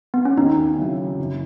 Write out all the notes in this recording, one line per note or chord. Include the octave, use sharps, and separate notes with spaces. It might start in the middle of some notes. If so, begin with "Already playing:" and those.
B3
C#4
D#2 D#4
C#3 F#3 C#4 E4
F#1